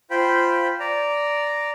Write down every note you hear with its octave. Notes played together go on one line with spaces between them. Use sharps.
F4 C5 G5 B5
D5 A#5